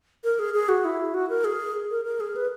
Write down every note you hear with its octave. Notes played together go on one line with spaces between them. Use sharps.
A#4
G#4
G#4
F#4
E4
F#4
A#4
G#4
A#4
A#4
G#4
B4